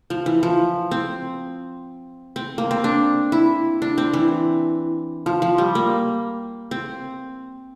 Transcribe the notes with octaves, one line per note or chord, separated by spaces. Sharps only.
F3
E3
F3
C4
C4
A#3
C4
D4
E4
D4
C4
E3
F3
F3
G3
A#3
C4